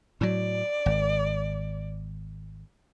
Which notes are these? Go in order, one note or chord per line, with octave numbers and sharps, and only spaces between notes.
A2 F#3 D5
G#1